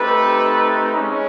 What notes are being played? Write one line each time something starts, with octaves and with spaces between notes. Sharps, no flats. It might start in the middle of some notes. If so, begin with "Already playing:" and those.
Already playing: A3 C4 D#4 G4 A4 B4
G#3 C#4